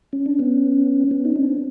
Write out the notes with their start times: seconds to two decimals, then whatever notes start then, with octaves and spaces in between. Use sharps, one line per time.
0.13 C#4
0.26 D4
0.39 B3 C#4
1.11 B3 C#4
1.25 D#4
1.36 C4 D4